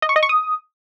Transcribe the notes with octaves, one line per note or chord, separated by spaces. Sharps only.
D#5
C#6
D#5
C#6
D#6